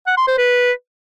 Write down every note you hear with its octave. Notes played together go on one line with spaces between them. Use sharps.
F#5
C6
C5
B4